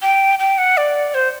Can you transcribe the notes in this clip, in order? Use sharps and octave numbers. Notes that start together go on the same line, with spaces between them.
G5
G5
F#5
D5
C5